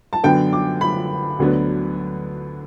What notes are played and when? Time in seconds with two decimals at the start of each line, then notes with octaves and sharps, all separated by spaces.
0.13 A5
0.23 F#2 D3 F#3 B3 D4 G5
0.53 D6
0.81 B5
1.39 D2 D3 F#3 B3 D4